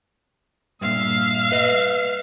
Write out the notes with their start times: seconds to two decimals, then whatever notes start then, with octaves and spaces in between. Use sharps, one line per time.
0.81 G2 A#2 E5 F5
1.52 B4 D#5